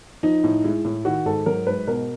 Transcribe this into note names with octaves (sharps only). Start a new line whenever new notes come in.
F3 D#4
A2
G#3 E4
A2
D#3 F#4
G#2 A4
F#3 A#4
G#2 B4
B2 A#4